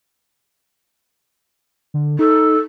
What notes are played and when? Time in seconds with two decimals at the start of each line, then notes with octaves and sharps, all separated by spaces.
1.94 D3
2.19 D#4 A4